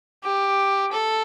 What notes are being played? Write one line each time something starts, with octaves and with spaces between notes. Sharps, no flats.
G4
A4